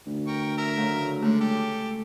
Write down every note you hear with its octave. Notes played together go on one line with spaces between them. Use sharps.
D2
A#4 G5 C#6
A#4 E5
C#3 F#3 A3
D3 G#3 A3 C#4
G4 A4